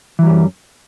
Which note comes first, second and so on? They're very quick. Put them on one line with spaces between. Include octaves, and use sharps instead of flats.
E3 F#3 G3 F#2